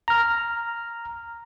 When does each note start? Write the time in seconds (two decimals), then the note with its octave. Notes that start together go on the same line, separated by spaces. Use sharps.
0.08 A#5 F6